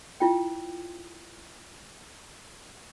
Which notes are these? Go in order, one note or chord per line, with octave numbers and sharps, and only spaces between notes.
E4 F4 G5